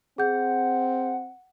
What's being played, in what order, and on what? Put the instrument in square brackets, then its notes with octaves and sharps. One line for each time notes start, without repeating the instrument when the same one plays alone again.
[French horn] C4 [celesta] G#4 G6 [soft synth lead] F#5